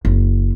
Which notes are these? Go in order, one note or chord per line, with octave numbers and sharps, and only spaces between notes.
F#1